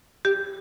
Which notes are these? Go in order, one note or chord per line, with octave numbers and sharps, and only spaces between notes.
G4